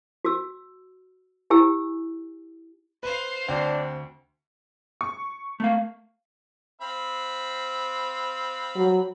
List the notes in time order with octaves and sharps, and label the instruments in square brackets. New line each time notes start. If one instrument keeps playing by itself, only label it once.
[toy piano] F#4 E6
E4 G4 G#5 E6
[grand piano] B4 [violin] C5 F5
[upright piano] D2 [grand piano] C4 [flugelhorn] D4
[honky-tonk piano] C#6
[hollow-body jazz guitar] A3 A#3 F5
[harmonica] C4 F5 B5
[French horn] F#3